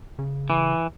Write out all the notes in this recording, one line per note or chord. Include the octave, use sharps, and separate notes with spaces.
C#3
E3